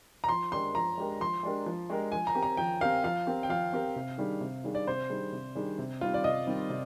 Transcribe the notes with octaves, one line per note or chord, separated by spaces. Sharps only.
A#5
F3 C6
G#3 D4 G4 A#4 C6
F3 A#5
G#3 D4 G4 A#4
F3 C6
G#3 D4 G4 A#4
F3
G#3 D4 G4 A#4
F3 G#5
A#5
C4 G4 A#4
A#5
F3 G5
C4 G4 A#4 F5
F3 F5
C4 G4 A#4
G5
F3 F5
C4 G4 A#4
C3
D#3 G3 D4 G#4
C3
D#3 G3 D4 G#4
D5
C3 C5
D#3 G3 D4 G#4
C3
D#3 G3 D4 G#4
C3
D#3 G3 C4 F4
D5
C3 D#5
D#3 G3 C4
C3